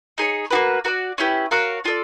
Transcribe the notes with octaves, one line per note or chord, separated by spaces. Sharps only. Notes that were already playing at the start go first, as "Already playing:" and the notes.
D#4 G#4 C#5
A#3 D4 F#4 B4
F#4 A#4 D5
C#4 E4 G4 B4
F#4 A#4 C#5 F5
D4 F4 A4 D5